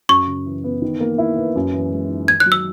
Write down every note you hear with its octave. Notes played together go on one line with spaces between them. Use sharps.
F#2 C#6
C#3
E3
B3
D#3
A#3
E4
B4
F#2
E3
G#3
D#4
D#3 G#6
F#6
F#3
E6